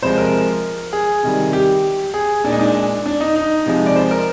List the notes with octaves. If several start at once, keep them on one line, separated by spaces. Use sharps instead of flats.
C3 F3 G#3 C5
A#4
G#4
C3 D#3 G3
G4
G#4
A#2 G#3 D4 D#4
D4
D4
D#4
D#4
C3 F3 G#3
D5
C5
A#4